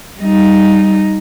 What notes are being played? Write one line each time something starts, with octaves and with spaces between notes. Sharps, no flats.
G3 D#4